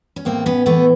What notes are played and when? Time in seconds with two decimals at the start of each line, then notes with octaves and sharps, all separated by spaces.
0.16 C#4
0.25 A2 A#3 C4
0.46 B3 C#4
0.66 E3 A3 B3